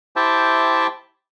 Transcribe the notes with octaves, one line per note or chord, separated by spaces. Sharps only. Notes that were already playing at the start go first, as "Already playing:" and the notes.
E4 G4 C5 E5 G5 A5